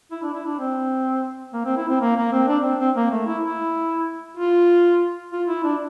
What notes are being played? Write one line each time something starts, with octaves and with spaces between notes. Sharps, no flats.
E4
D4
E4
D4
C4
A#3
C4
E4
C4
A#3
A#3
C4
D4
C4
C4
A#3
A3
E4
E4
F4
F4
E4
D4